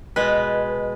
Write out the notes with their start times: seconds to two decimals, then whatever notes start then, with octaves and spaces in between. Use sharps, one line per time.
0.16 B2 G#3 B4